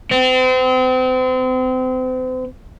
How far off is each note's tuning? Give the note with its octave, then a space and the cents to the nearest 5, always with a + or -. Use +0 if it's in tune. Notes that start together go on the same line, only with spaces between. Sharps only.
C4 -35